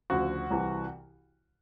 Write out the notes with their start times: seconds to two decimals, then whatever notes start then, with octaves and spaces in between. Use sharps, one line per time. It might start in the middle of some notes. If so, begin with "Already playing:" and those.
0.10 D2 C#3 F3 F#4
0.51 C2 C3 E3